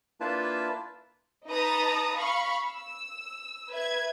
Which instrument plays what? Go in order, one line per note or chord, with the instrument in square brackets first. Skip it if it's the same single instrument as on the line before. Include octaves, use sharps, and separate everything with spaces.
[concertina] A#3 D4 E4 F4 B4 A5
[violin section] D#4 B4 A5 A#5 D#6
F5 B5 C#6
E6
B4 E5 G#6